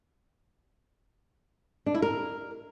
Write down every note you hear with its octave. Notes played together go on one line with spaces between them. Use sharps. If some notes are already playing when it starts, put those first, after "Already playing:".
D4
E4
A#4